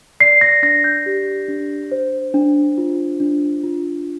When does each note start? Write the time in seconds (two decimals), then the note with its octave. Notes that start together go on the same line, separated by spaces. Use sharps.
0.20 D5 C7
0.41 A#6
0.63 D4 A#6
0.84 G6
1.06 G4
1.48 D4
1.92 C5
2.34 D4
2.78 F4
3.20 D4
3.63 F4